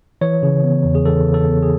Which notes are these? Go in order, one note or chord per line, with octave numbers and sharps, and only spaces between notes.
E3 C#5
C#3
B3
E2
G#4
E3 A4
C#3
A4
B3
G#4